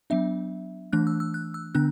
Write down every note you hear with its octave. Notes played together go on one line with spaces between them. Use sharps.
F#3 B3 D4 E5
E3 A3 D4 F#6
E6
E6
F#6
E6
D3 B3 D4 F#6